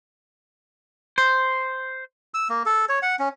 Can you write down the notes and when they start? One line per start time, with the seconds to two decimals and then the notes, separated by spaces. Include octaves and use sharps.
1.18 C5
2.34 E6
2.49 A#3
2.66 A4
2.89 C#5
3.02 F#5
3.19 C#4